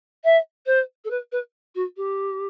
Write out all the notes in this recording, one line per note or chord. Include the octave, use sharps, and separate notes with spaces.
E5
C5
A4
B4
B4
F#4
G4